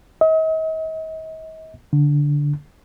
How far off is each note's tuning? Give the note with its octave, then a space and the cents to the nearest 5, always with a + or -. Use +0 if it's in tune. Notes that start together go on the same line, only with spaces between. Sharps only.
D#5 +40
D3 -10